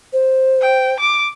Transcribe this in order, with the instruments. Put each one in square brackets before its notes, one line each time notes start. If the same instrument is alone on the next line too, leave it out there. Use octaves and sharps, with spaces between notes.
[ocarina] C5
[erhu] G5
D6